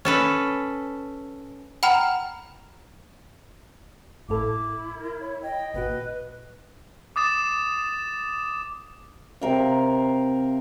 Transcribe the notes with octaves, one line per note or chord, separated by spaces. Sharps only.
C#4 A4 B4
F#5 G5 A#5 B5 F6
G#1 A2 E4 A4 D6
A#4
C#5
D#5 G5
G#1 A#2 F#4 B4
D6 D#6 A6 E7
C3 A#4 F5